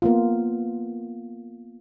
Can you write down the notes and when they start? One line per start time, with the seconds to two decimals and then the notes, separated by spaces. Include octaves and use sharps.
0.02 A#3 B3 F4